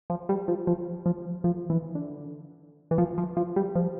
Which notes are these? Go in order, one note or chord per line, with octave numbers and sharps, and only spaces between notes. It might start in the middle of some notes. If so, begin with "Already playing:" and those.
F3
G3
F3
F3
F3
F3
E3
D3
E3
F3
F3
F3
G3
F3